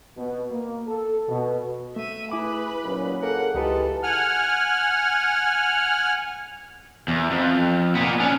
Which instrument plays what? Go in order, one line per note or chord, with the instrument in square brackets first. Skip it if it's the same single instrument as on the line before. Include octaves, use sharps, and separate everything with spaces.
[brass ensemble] B2
A#3
A4
B2
[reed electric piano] A3 [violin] E5 D#7
[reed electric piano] E4 D6 [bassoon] G#4 [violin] B4 B5
[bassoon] D#2 [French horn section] A#2 F#3 C#4
[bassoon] A#3 [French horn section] G#4 A4 [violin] F#5
[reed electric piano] C#2 G4 B4 [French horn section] E3 G#3 [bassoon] D#4 [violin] F4 A4
[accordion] F#5 G#5 F6
[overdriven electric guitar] E2
F2
A#2 B3
C#4 D4